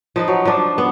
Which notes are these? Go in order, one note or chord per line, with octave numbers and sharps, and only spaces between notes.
F3 D#4 B4
F#3
F3 D4
B3